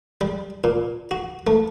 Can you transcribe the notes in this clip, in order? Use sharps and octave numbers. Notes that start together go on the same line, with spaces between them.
G3
A#2
F#4
A3